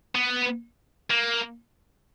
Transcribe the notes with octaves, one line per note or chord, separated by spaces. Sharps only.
B3
A#3